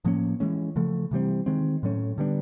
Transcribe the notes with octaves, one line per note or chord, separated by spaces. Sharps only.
A2 F3 A#3 C#4
E3 G#3 C#4
C#3 F3 A3
C3 E3 G3 C4
D#3 G#3 C4
A2 F#3 A3 C#4
D3 G3 B3 D4